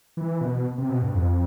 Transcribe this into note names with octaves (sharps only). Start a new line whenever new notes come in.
E3
B2
C3
B2
G2
F2